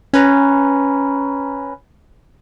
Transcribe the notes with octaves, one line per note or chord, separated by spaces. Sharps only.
C#4 B4 A#5